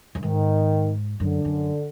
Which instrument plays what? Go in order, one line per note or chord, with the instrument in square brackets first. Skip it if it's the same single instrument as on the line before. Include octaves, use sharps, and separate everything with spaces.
[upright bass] F#2
[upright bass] G#2 [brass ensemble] D#3
[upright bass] F#2 [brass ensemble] D3
[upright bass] F#2